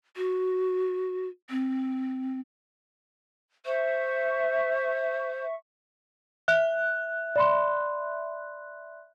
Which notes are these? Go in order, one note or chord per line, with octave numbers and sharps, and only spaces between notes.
F#4
C4
C5 E5 C#6
E5 F#6
D5 B5 C6